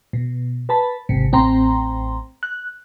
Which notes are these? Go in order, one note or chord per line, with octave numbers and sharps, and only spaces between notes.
B2
B4 A5 B5
G#1 C3
A1 C4 G5 A#5 C6
F#6